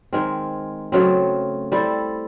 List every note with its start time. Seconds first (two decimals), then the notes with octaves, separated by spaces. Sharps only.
0.13 D#3 G#3 C4
0.92 C#3 F#3 A3 C4
1.72 G3 C4 E4 A4